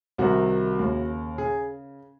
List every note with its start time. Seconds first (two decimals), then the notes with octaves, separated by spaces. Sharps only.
0.18 C2 C3 D#3 F#4
0.79 D#2 C#3
1.38 C#3 G#4